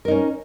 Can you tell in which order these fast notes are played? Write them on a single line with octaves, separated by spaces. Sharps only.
A#4 D#4 C#4